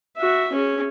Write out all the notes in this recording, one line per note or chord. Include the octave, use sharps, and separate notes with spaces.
F#4 E5
C#4 G#4